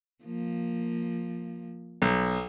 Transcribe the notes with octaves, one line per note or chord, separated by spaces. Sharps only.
F3 A#3
B1